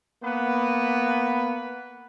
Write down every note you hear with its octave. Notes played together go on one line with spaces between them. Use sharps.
A#3 B3 B4